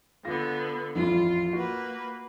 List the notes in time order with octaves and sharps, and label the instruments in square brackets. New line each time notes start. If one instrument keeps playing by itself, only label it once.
[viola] D3 B3 [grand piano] F4 A#6
[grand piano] A1 F2 E4 [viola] F4
[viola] A#3 B4 [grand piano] F#4